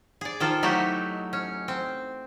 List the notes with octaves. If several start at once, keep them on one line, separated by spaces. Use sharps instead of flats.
G#4 D5
D#3 F3 F4 A4
F#3 A3 D#4 E4 F#4 G4
C#4
C4